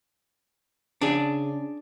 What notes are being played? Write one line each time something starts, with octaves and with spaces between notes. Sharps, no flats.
C#3 D4 G#4